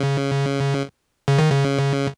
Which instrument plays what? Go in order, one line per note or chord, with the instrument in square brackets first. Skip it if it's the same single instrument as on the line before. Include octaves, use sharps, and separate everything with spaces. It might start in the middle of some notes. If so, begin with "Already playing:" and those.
Already playing: [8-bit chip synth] C#3
C#3
D#3
C#3